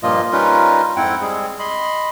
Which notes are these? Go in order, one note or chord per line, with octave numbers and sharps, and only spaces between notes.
G2 A#2 F3 A#3 F4 D#5
G3 C#4 D#4 F4 A#4 B4
F2 G#2 C4 E4 F#5 G5
G3 G#3 C4 G#4
D#5 B5 C6